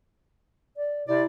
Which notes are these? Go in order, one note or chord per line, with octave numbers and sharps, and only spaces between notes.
D5
C3 E4 D5